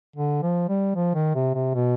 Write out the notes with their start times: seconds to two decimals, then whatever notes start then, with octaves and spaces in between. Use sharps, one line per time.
0.16 D3
0.42 F3
0.69 G3
0.95 F3
1.15 D#3
1.35 C3
1.54 C3
1.75 B2